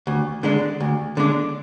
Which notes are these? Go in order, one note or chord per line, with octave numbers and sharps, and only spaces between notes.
D2
D3 G#3 D4
D2
D3 G#3 D4